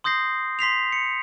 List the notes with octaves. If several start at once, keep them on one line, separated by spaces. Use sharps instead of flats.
C6 D#6 G6 A#6 C7
C6 B6 C7 F7
C#7